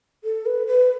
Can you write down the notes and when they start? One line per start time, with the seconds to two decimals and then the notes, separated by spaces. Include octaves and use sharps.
0.24 A4
0.46 B4
0.67 B4